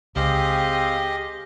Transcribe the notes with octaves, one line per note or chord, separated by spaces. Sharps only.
C#2 C4 G4 G#4 D#5 F5